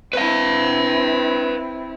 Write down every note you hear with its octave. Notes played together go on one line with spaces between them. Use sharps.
C4 E4 B4 F5